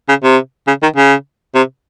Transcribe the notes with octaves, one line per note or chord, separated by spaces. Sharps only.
C#3
C3
C#3
D#3
C#3
C3